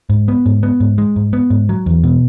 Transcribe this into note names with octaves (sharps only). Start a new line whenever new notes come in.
G#2
B3
G#2
B3
G#2
G#3
G#2
B3
G#2
F#3
E2
B2